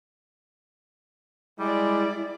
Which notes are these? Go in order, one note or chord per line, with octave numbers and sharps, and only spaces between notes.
G3 G#3 E4 D5